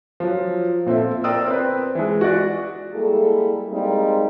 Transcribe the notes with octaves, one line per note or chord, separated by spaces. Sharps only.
F3 F#3
A#2 C4 A4 E5
A#4 C5 D5 G5 D#6 E6
C4 B4
E3 G#3
F#4 D5
G3 G#3 A#3 E4 G#4 A4
G3 G#3 A#3 C4 D#4